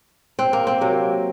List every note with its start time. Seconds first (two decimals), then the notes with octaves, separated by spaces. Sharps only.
0.39 C4
0.53 A#3
0.67 C4
0.81 C3 F#3 A#3